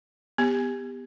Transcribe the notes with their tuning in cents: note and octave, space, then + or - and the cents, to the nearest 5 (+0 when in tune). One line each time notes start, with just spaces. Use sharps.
B3 +0 G4 +25